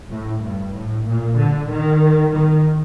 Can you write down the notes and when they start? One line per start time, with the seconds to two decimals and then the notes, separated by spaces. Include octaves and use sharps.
0.10 A2
0.42 G2
0.74 A2
1.06 A#2
1.38 D3
1.70 D#3
2.34 D#3